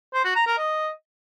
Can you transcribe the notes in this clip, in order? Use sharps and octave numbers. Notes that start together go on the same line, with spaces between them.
C5
F#4
A#5
A#4
D#5